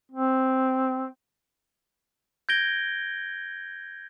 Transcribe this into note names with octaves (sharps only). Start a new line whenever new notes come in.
C4
G6 G#6 A#6 D7 G7